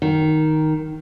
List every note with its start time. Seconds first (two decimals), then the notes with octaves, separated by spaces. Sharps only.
0.02 D#3